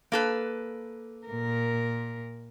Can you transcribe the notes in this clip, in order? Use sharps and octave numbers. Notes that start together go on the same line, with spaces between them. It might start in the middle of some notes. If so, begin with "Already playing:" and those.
A#3 A4 B4
A#2 A#4